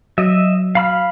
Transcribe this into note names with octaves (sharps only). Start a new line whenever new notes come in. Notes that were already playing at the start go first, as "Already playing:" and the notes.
F#3 D#5 E5
F5 B5 F6